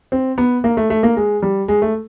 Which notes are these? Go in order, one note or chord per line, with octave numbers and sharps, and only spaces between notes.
C4
B3
A#3
A3
A3
A#3
G#3
G3
G#3
A3